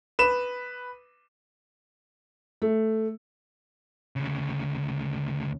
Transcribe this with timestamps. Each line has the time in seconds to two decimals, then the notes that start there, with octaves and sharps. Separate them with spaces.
0.19 B4 E7
2.62 A3
4.16 D2 C#3